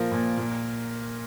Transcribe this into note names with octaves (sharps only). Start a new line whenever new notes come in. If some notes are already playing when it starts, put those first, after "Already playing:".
Already playing: A#2 F3 A#4
A#2
A#2